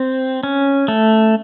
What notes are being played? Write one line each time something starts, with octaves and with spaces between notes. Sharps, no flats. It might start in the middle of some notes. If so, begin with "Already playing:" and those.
Already playing: C4
C#4
A3